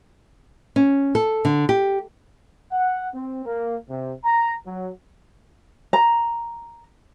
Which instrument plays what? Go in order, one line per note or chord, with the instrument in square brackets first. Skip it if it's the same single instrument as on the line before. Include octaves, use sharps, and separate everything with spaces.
[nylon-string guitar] C#4
A4
D3
G4
[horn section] F#5
C4
A#3
C3
A#5
F#3
[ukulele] A#5